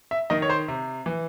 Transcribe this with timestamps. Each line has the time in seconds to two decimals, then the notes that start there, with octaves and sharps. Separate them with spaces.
0.11 E5
0.30 D#3 D#5
0.42 C#5
0.50 C5
0.68 C3
1.06 E3